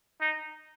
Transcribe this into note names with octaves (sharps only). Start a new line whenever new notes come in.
D#4